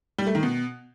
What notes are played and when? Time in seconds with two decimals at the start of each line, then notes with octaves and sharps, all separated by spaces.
0.18 G3
0.27 A3
0.35 D#3
0.43 B2